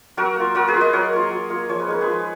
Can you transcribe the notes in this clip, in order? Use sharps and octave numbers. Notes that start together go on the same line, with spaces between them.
F#3 F#4 A#4
A#3 F4
F#3 F#4 A#4
G#4 B4
A#3 F4
B4 D#5
F#3 A#4 C#5
A#3 F4
F#3
A#3 F4
F3 C#5
B4
G#3 D#4 A#4
G#4 B4
F3